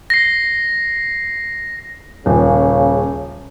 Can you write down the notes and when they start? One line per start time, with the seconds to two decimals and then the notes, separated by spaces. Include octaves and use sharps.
0.10 A#6 C7
2.26 D#1 C#3